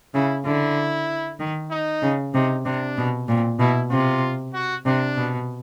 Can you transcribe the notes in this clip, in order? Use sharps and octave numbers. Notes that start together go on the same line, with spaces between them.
C#3 E4
D3 E4
D#3
D#4
C#3
C3 D#4
C3 D4
B2
A#2 C4
B2 E4
C3 F4
F#4
C3 D4
B2